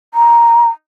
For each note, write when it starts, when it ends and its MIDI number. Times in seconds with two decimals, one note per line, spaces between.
0.14 0.68 82